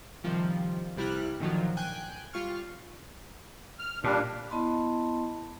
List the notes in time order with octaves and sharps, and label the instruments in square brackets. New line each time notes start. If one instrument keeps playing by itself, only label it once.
[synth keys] C3 D#3 F3 G3
C2 C3 G3 E4 F6 F#6
A#2 D3 D#3 F3 F#3
G5 G#5 F#6 G6
G3 F4 C#6 F6
[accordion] F6
[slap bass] A#2 [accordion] G3 D4
[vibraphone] B3 E4 D#5 A5 B5 C6